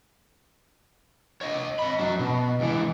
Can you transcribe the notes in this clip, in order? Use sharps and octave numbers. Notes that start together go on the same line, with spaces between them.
C#5 D#5
D#5 B5
F#3 C#4
B2
C#2 E3